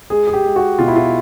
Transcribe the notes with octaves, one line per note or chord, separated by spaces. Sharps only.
G#3 G#4
G#4
G4
G#3
F#4
B2 F4
E4
F4